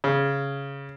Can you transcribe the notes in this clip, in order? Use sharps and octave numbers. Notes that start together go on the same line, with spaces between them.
C#3